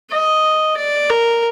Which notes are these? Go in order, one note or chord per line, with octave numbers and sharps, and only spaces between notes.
D#5
D5
A#4